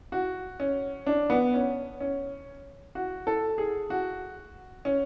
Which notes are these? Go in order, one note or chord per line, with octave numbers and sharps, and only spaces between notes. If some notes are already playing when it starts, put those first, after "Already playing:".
F#4
C#4
D4
B3
C#4
C#4
F#4
A4
G#4
F#4
C#4